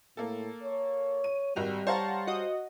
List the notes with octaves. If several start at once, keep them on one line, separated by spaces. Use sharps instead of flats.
A2 A#3 A4
C#5
D#7
G#1 G3 F#4 F7
C5 C#5 F5 F#5 A5 A#5
F#4 D#5